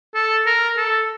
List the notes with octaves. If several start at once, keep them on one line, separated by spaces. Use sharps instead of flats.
A4
A#4
A4